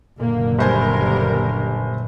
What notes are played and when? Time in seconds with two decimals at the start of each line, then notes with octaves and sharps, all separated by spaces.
0.20 F#1 A#2 D3 A#3
0.58 G1 G3 A#4 C5 G#5